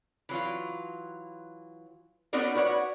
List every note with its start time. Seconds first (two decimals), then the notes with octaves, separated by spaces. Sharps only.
0.29 E3 F#3 F4
2.33 B3 C#4 D#4 F#4 A#4 D5
2.55 F#4 B4 C#5 D5 F#5